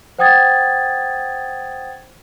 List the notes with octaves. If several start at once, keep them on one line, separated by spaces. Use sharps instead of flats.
C5 F#5 G5 D#6 G#6 A6